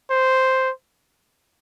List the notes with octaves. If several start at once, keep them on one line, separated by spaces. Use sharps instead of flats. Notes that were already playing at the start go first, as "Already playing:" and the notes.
C5